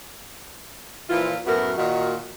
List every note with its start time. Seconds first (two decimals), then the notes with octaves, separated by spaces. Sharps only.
1.10 A#2 E3 F3 E4 F4
1.47 F#2 A2 A3 B3 F#4 A#4
1.78 A#2 D#3 F#4